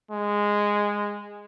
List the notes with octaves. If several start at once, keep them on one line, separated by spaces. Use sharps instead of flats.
G#3